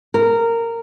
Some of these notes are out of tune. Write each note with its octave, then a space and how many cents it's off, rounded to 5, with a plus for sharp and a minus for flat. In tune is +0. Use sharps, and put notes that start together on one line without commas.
A#4 -15